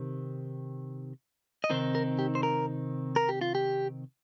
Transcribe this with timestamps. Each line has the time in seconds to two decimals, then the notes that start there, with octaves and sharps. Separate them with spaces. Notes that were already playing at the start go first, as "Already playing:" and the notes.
Already playing: C3 D#3 C4
1.64 D#5
1.70 C3 D#3 C4 D#4 C5
1.95 A#4
2.19 G4
2.35 C5
2.43 A#4
3.16 A#4
3.29 G4
3.41 F4
3.55 G4